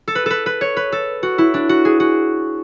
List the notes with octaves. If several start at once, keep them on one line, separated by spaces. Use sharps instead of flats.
A4
B4
A4 B4
B4
C#5
B4
A4
F#4
E4
D4
F#4
G#4
F#4